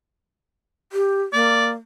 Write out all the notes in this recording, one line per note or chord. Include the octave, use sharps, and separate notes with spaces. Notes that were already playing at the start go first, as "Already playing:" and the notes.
G4
A#3 D5